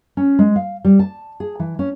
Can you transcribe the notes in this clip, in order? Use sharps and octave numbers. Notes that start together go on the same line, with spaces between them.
C#4
G#3
F5
G3
A5
G#4
E3
C#4